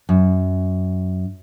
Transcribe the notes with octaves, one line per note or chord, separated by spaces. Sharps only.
F#2